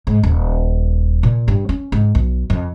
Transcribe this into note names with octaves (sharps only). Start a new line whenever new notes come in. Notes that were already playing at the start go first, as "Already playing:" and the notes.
G#2
D#1
A#2
G2
C#4
G#2
B1
F2